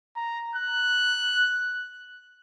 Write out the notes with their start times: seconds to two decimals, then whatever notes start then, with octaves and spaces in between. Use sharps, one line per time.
0.16 A#5
0.56 F#6